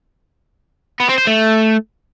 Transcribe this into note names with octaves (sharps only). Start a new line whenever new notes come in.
B3
C4
C5
A3